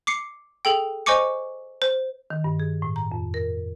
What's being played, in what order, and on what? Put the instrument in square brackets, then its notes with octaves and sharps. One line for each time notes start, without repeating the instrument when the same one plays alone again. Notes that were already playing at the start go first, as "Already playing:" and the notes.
[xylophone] D6 C7 C#7
G#4 A4 G5
C5 D#5 G#5 C#6 D6 C#7
C5
[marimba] D#3
G2
G#4
A2
A#5
F2
A#4